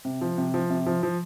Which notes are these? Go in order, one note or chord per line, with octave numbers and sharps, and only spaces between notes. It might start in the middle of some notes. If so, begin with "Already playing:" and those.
C3
F3
C3
F3
C3
F3
F3